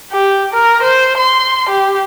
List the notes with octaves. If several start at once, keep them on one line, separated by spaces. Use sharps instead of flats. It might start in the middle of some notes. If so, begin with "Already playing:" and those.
G4
A#4
C5
C6
G4